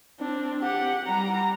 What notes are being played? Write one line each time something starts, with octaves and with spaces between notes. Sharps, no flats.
C4 D4
G4 F#5
G3 A#5